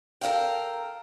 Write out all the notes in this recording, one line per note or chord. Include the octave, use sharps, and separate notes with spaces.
A4 A#4 D5 F5 G5